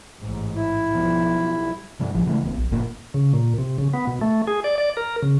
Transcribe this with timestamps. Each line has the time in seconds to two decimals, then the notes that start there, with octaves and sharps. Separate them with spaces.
0.21 A1 G#2
0.55 E4
0.91 B1 F3 G3
1.99 G2 C3 G3
2.14 A1 F3
2.26 C#3 E3 G#3 A3
2.43 D1 B3
2.57 A#1
2.70 G1 F2 A#2 A#3
3.14 C#3
3.33 A#2
3.58 C3
3.78 C#3
3.94 B3
4.07 B2
4.21 A3
4.47 G#4
4.64 D5
4.78 D5
4.97 A#4
5.22 C#3